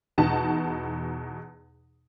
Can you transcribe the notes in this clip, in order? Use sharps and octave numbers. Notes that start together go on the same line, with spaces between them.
E2 B2 D#4 F#5 A5